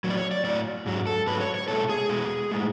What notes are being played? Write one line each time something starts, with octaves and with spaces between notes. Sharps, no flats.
A2 F#3
D5
C#5
D5
A2 F#3 D5
G#2 F#3
A4
G#2 F#3 B4
C#5
C#5
B2 G#3 A4
G#4
B2 G#3
A2 G#3